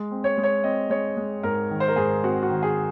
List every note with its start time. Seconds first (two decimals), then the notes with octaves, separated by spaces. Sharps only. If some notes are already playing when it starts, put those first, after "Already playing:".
Already playing: G#3
0.11 C4
0.24 C#5
0.37 G#3
0.43 C#5
0.63 C4 D#5
0.90 G#3 C#5
1.17 G#3
1.43 G#2 A#4
1.71 D#3
1.80 C5
1.88 A#4
1.96 G#2 G#4
2.23 C4 F#4
2.43 F#4
2.49 D#3
2.63 G#4